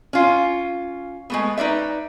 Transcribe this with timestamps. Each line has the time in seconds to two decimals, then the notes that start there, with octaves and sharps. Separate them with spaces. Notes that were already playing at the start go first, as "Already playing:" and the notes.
0.13 C#4 F4
1.30 G#3 A3 B3
1.58 D#4 B4 D5 E5